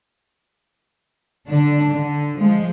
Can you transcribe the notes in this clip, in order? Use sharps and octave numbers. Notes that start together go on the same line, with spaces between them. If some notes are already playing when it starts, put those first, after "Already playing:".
D3 D4
D3
F3 G#3